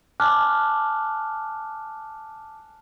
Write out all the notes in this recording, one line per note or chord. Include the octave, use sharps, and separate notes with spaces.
G#5 A5 D6 F6 F#6